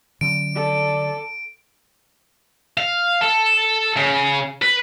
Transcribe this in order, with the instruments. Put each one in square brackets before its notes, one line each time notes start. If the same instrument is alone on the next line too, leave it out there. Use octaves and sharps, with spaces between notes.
[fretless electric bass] D3 F#3 C#4 [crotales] D7
[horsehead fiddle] A4 [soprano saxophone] D5
[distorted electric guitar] F5
A4
C#3
B4